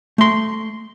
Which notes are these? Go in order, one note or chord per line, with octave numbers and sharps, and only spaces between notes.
A3 C6